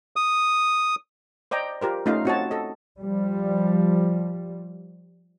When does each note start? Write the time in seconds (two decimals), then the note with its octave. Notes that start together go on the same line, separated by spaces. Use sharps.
0.16 D#6
1.51 C5 D5 D#5 G5 A#5
1.81 F4 G4 A#4 C5
2.06 A3 C#4 D#4 F4 D#5 F5
2.25 C4 F4 F#4 C#5 D#5 A5
2.51 A4 D#5
3.00 F3 G3